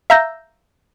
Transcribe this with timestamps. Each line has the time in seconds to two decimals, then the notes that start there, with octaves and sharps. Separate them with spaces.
0.10 E5 F5 A#5 E6 G6 A#6